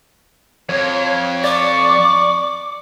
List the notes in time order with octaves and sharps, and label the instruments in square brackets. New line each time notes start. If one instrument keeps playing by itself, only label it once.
[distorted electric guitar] F2 [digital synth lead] C#5
[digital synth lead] D5 [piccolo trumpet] C#6 [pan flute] D6